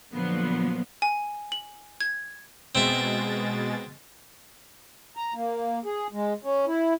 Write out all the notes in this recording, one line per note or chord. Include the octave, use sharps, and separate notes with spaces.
A#2 D3 F3 F#3 B3
G#5
F#7
G#6
B2 G#3 C4 E5 A6
A#5
A#3
G#4
G#3
C#4
E4